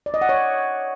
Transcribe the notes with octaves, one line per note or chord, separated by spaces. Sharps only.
D5
D#5
F#5
C#5